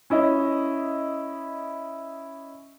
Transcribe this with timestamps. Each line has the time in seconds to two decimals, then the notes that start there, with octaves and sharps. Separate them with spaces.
0.10 C#4 E4 D#5